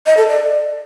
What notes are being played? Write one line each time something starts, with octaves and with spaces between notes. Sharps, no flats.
D#5
A4
D5